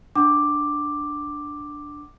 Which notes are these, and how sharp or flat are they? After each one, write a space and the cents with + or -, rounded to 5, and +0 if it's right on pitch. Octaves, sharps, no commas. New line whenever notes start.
D4 +0 F#5 +35 D6 +5